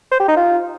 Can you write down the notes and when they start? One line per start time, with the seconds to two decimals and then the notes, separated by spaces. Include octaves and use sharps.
0.11 C5
0.20 G4
0.28 D#4
0.37 F4